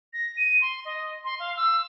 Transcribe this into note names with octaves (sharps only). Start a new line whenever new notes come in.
A#6
D#7
C6
D#5
C6
F5
E6